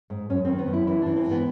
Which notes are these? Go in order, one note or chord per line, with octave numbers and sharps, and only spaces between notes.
G#2
F#2 C#4
D#3 C4
B3
F#2
E4
E3 E4
E3 D4
C4
G#2
B3